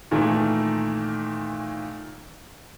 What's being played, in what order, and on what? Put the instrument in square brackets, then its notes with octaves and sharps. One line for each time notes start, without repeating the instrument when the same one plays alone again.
[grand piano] A#2 D#3 E3 A3